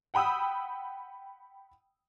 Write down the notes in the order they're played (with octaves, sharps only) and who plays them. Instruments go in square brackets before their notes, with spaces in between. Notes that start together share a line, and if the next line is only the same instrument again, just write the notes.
[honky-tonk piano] F#5 G5 B5 D#6 E6